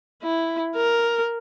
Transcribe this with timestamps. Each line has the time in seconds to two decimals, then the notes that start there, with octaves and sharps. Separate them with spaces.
0.23 E4
0.76 A#4